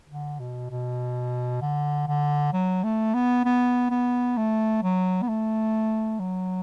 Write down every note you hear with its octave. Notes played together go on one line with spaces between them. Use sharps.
D3
B2
B2
D3
D3
F#3
A3
B3
B3
B3
A3
F#3
B3
A3
F#3